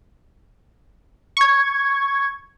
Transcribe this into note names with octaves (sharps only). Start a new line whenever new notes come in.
C#6 G#6